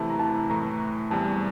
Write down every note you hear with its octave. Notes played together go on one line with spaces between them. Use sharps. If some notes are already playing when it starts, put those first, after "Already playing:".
Already playing: C3 E3 A3 E4 A5
A#5
A5
A2 E3 A3 A#5
E2 C3 G3 A5